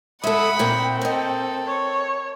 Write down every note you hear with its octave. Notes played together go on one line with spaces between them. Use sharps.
G#3 A4 E5 F#5 B5 D#6
A#2 A#3 C4 G5
A4 A#4 D#5
C#5